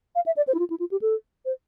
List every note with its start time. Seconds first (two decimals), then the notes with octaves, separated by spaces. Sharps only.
0.15 F5
0.26 E5
0.37 D5
0.47 C5
0.54 E4
0.59 F4
0.70 E4
0.80 F4
0.91 G4
1.02 A4
1.45 C5